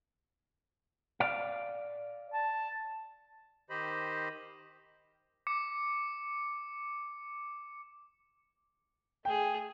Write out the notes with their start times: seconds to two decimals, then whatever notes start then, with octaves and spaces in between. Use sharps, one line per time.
1.20 D5 F5
2.33 A5
3.70 D#3 G4 C5 D#5 B5
5.47 D6 C#7
9.25 A3 G#4 G5